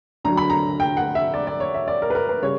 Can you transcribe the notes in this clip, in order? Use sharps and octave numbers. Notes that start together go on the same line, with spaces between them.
D2 D3 F#3 A#5
B5
A#5
G5
F#5
E5
D5
D5
C#5
E5
D5
A#4
B4
A#4
B4
C#3 G3 C#5